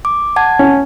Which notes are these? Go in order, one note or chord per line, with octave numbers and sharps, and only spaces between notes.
D6
F#5 A5 G#6
C#4